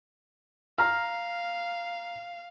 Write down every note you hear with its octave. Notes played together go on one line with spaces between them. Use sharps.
F5 A#5 F6